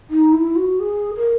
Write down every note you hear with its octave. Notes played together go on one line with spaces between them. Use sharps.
D#4
E4
F#4
G#4
A#4